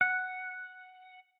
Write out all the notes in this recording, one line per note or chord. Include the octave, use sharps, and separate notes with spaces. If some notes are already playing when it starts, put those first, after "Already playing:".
F#5